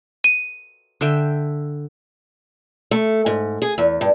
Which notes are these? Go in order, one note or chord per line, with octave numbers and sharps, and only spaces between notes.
D#7
D3 E5 G5
A3
G#2
G#4
E2
G2